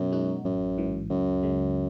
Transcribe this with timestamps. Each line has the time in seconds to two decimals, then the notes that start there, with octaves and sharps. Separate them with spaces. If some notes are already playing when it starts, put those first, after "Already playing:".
Already playing: F#2 B2
0.12 G#3 D#4 F#4
0.45 A1 F#2
0.78 G#2 E3
1.10 C#2 F#2
1.43 C#3 G#3